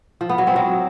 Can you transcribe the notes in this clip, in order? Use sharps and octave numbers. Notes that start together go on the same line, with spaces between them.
F3
B3
F#3
C4
F#3